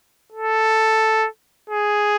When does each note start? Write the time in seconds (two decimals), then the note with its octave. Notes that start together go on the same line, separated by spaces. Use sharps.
0.32 A4
1.70 G#4